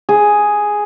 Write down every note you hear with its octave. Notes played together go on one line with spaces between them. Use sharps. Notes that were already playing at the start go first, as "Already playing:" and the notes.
G#4